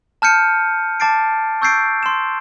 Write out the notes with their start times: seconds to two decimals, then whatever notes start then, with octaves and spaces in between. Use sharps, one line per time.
0.22 A5 F6 G6 C#7 D#7
1.00 A5 D6 A6 C7 D7
1.62 C#6 E6 G6 A6 C7 D7
2.03 C6 E7